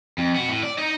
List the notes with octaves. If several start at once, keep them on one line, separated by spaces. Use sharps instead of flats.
F2
B3 F#4
A2
D5
D#4 D#5